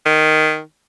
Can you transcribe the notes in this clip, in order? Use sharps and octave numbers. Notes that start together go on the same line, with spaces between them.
D#3